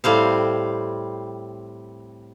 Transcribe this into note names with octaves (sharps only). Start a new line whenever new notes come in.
A2 G3 C4 F5